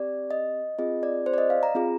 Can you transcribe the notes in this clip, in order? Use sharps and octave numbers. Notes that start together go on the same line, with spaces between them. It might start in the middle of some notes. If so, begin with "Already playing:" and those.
Already playing: C4 G4 D5
D#5
C4 F4 G#4 D#5
D5
C5
D5
D#5
F5
A#5
C4 F4 G#4